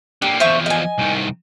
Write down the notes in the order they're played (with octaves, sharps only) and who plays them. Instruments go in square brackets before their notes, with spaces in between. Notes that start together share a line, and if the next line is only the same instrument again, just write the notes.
[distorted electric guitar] D3 A#3 [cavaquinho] G4
[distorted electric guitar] E2 F3 [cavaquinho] C5 E5 C#6
[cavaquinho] D#5 G#5
[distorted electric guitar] C2 D#3